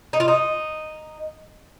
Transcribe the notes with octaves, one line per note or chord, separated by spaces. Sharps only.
D#4
F4
D#4